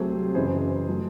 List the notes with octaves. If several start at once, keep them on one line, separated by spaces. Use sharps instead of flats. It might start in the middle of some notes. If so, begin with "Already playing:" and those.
Already playing: C2 C3 F#3 A3 G#4 C5
F#1 F#2 E3 G#4 C5
F#3 A3